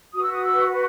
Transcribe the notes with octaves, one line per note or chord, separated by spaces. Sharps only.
F#4 B4 D#6
E6
D#6
E6